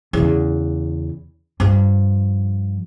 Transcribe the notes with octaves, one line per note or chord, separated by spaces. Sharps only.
E2 C#3
G2 F3